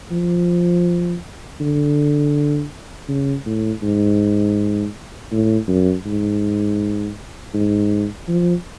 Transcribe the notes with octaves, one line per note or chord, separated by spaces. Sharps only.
F3
D3
C#3
A2
G#2
A2
F#2
G#2
G#2
F3